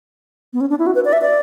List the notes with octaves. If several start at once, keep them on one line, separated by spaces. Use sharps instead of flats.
B3
C#4
D4
E4
F#4
B4
D5
E5
D5